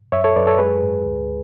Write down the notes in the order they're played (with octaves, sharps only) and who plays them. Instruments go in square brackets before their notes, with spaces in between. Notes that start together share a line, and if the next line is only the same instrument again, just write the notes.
[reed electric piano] F#2 C#5 E5
A4 C#5
F#2 B4 D5
A4 C#5
G#3 G#4 B4
G#2
D2